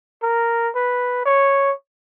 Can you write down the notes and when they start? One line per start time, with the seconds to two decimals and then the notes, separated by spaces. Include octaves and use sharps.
0.23 A#4
0.75 B4
1.25 C#5